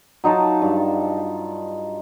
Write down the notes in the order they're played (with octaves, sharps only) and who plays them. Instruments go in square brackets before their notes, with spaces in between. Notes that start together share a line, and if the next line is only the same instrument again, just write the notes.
[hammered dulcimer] F#3 D#4 F4 A5
G2